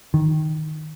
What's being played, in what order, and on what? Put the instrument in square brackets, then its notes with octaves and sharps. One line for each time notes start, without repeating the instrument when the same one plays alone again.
[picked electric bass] D#3